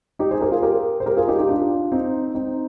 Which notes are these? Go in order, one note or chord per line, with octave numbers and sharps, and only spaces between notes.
D#4 G4
G#4 C5
G4 A#4
F4 G#4
G4 A#4
C5
G4 A#4
F4 G#4
D#4 G4
D#4 G4
D4 F4
C4 D#4
C4 D#4